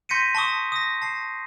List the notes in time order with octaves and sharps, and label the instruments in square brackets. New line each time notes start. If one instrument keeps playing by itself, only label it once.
[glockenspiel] C6 G6 A#6 B6 C#7 D#7
A5 C6 C#6 D#6
D#6 A#6
A5 C7